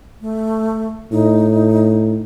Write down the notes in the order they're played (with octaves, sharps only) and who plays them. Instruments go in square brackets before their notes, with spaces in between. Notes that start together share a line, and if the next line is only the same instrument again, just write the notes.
[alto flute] A3
[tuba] A2 [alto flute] D#4